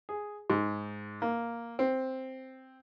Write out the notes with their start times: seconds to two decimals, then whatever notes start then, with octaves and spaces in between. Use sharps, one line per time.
0.09 G#4
0.50 G#2
1.22 A#3
1.79 C4